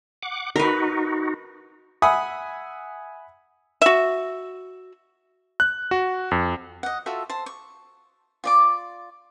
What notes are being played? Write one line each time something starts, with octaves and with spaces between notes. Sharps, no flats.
F#5 D6
D#4 F#4 A#4 B4
E5 F#5 G#5 B5 D#6
F#4 E5
F#6
F#4
F2
D#5 F#5
F4 F#4 A4 E5
C5 A5 C6
C#6
F4 D5 D6